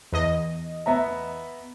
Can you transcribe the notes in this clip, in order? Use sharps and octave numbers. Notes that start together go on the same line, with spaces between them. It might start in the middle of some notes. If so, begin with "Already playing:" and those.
E2 D#5
B3 E5 A#5